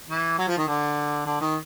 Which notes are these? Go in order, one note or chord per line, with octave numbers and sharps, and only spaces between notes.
E3
F#3
F3
D#3
D3
D3
D#3